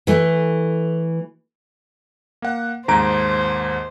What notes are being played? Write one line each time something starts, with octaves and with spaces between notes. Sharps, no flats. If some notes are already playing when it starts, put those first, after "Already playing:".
E3 A3
A#3 F#5
D#2 G#2 C5 A#5 D7